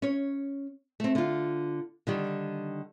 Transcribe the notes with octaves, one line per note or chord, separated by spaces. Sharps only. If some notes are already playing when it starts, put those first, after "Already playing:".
C#4 C#5
A3 C4
D3 F4
D3 D#3 G3